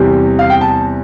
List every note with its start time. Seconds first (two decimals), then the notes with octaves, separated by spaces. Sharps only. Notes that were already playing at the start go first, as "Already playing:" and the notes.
Already playing: E2 C3 G3
0.39 F5
0.50 G5
0.61 A5